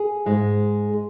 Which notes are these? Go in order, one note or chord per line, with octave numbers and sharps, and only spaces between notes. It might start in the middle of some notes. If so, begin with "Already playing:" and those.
Already playing: G#4
G#2 G#3